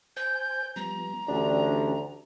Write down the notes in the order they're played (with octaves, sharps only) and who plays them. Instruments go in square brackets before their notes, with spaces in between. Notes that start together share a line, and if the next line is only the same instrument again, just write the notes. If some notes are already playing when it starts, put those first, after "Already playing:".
[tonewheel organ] C5 G#5 [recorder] G6
[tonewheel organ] F3 G3 B3 [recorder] A#5
[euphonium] D2 [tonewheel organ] E3 C#4 G4 [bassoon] D4